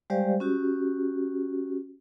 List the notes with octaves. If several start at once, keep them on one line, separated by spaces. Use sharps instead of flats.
G3 G#3 G4 C5 D5 F5
C#4 F#4 G4